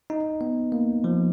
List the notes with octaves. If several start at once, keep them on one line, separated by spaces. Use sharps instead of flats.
D#4
B3
A#3
F3